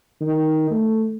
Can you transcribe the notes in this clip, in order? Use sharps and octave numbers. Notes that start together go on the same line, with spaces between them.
D#3
A3